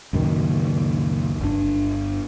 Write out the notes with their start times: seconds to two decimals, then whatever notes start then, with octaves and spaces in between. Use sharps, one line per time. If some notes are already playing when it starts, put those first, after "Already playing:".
0.13 C#2 F#2 A#2 D#3
1.40 G1 D4